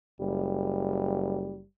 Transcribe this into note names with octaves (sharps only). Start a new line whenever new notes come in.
F#1 G3